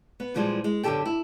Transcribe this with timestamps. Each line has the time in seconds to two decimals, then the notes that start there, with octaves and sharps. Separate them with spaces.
0.20 B3
0.34 A#2 E3 F3 G3 G#3
0.64 G#3
0.83 F#2 B2 D3 G4 A4 G5
1.06 E4